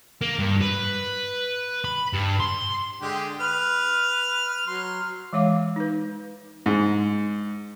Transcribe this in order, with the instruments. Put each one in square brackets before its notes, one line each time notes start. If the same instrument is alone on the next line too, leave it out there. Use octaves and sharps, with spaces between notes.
[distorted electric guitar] A#3
G2
B4
B5
G2
C6
[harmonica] D3 G#3 G4
B4 F6
F#3 C6
[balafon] E3 G#3 C#5 F5 D6
D#4 B4
[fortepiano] G#2